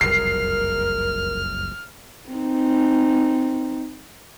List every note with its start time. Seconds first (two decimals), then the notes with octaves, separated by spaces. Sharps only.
0.01 F#1 C2 F2 A#4 F6 C7
2.30 C4 D#4